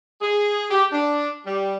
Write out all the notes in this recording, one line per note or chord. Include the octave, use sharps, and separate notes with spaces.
G#4
G4
D4
G3